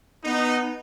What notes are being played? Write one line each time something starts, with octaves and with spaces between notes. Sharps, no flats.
B3 D#4